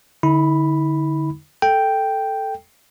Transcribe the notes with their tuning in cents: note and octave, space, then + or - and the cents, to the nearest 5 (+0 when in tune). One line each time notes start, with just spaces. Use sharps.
D3 +5 E4 -45 B5 +0
A4 +0 G5 +0